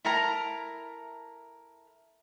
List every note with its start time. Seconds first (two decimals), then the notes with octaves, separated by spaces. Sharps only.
0.05 E4 A4 A#4 A#5